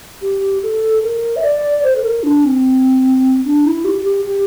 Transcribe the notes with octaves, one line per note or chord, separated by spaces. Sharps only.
G4
A4
A#4
E5
D5
C5
A4
A#4
D4
C4
D4
E4
G4
G4
G4